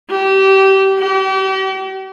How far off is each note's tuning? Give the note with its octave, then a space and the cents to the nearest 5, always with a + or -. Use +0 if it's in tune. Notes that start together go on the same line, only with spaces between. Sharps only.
G4 -25
G4 -40